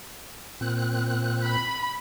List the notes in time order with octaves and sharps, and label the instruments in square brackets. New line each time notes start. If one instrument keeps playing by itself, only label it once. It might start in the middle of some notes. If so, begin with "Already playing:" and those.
[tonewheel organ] A#2 C4 F#6
[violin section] B5